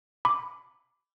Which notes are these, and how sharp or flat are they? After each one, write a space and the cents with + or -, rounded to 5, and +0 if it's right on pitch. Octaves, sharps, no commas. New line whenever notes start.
B5 +10 D6 +0